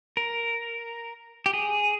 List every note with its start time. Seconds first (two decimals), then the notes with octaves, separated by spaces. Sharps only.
0.17 A#4
1.46 G4
1.54 G#4